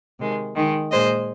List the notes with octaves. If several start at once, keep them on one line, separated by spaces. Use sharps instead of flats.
C3 D#3 G#3
D#3 G#3
A#2 G#3 C5 D#5